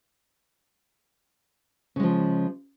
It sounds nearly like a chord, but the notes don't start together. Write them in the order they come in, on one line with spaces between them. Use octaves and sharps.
C#3 G#3 F3